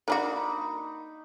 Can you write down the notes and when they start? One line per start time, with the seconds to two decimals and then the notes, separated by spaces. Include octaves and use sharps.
0.08 A#3 D4 D#4 F#4 B5 D6